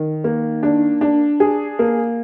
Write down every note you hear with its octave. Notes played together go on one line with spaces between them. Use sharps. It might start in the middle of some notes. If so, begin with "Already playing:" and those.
Already playing: D#3
A#3
D4
D4
G#4
A#3